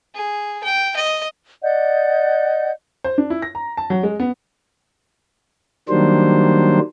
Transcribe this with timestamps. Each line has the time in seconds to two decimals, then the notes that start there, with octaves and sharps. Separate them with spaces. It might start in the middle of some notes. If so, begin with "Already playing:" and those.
0.15 G#4
0.64 G5
0.96 D#5
1.63 D5 D#5 F#5 G6
3.04 C5
3.18 D4
3.30 E4
3.42 A#6
3.55 A#5
3.77 A5
3.90 F#3
4.03 G#3
4.20 B3
5.89 D#3 F#3 G3 A#3 D4 C5